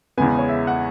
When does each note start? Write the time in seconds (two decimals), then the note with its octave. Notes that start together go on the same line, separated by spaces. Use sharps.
0.18 E2 C#3 G#3 B3 G#5
0.38 C#5
0.49 E5
0.67 F#5